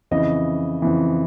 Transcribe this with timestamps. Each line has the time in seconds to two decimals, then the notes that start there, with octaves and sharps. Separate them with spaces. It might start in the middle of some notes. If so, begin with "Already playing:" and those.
0.11 F2 C#3 E3 D#5
0.82 F2 C#3 E3